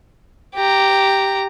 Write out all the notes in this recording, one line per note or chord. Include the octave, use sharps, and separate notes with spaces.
G4 A#5